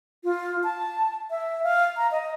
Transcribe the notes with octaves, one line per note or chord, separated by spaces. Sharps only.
F4
A5
E5
F5
A#5
D#5